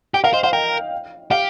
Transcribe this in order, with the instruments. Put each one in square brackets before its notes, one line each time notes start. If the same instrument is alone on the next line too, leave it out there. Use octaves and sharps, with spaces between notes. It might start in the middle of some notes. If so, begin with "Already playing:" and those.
[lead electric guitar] G4 [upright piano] G5
[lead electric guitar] A#4 [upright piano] F5
[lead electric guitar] C5 [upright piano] D#5
[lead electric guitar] C5 [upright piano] F5
[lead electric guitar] A#4 [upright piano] G5
[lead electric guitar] G4 [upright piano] F5